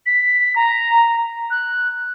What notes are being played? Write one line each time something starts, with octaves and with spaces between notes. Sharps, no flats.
B6
A#5
F#6